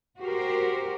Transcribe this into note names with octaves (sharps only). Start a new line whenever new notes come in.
F#4 G4 A#4 C5